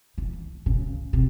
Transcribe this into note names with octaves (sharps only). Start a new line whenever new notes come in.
E3
C#3
C3